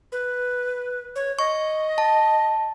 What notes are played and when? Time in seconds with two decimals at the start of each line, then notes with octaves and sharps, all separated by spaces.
0.12 B4
1.16 C#5
1.39 D#5 C#6
1.98 A5